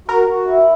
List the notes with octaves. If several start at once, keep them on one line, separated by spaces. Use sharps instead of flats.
F#4 A#4
F#4
E4